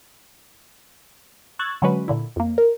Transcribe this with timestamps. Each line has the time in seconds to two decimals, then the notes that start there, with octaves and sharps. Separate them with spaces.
1.59 C#6 E6 F#6 G#6 A6
1.82 D3 F#3 G#3 C#4 F#4 B4
2.08 A#2 D3 E4
2.36 F2 A#3
2.58 A#4